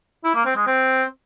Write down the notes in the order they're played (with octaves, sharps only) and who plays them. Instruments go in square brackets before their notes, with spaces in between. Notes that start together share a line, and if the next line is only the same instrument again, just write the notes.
[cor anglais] E4
A#3
C4
G#3
C4